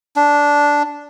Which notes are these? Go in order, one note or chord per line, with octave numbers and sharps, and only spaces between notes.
D4